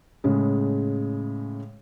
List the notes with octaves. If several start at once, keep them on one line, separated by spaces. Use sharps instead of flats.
A2 C#3 G#3